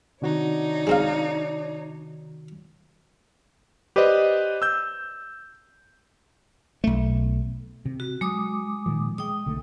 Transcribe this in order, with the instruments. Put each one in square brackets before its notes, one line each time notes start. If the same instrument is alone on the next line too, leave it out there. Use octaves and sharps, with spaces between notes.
[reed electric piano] C3 D#3 F#4 [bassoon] D4 [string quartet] D#4 C#5
[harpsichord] G#3 C4 F5
[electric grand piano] G4 B4 C5 D5 D#5
E6 G6
[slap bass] B1 A3
[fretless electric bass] C3
[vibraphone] F#4
[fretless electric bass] F#3 [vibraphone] G#3 D6 D#6
[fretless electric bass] A#2 D#3 F3
[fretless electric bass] G#3 [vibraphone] G5 D#6
[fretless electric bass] B1 D3 A3